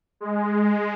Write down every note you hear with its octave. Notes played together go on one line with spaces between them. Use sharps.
G#3